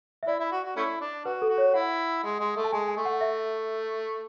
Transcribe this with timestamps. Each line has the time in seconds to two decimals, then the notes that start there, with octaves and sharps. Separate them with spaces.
0.23 E5
0.27 E4 D5
0.40 E4
0.52 F#4
0.64 F#4
0.76 A3 C#4 E4
1.01 D4
1.25 F#4 B4
1.42 A4
1.49 F#4
1.58 C#5
1.74 E4 F#5
2.23 G#3
2.40 G#3
2.56 A3
2.64 A5
2.72 G#3 G#5
2.88 G#5
2.97 A3
3.05 F#5
3.21 E5